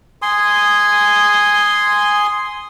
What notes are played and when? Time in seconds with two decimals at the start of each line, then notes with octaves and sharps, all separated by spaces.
0.22 G#5 C6 D#6